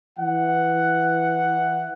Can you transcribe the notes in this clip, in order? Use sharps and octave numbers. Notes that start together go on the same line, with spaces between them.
E3 F#5